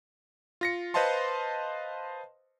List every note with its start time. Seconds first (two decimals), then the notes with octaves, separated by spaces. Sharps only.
0.61 F4 A#6 C#7
0.94 B4 C5 D#5 F5 A5 C6